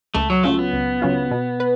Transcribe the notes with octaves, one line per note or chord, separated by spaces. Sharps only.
C#2 A3
F#3
C#3 F#3 A3 C#4 F4
B3
C#2
C#3 F#3 C#4 F4
B2
B4